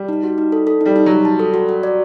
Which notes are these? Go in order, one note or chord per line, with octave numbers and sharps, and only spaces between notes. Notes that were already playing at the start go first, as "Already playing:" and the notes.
Already playing: G3
D#4
F#4
D#4
A4
A4
G3 D#4
D#4
F#3 F#4
A5
A4
F#4
F#4
D5